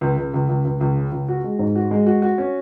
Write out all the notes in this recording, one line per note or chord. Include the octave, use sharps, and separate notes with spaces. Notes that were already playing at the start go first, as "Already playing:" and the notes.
C#2
C#2
C#2
C#2
C#2
C#2
C#3
C#2
F#4
G#3
G#2
F#4
G#3
F#4
F#4
C#4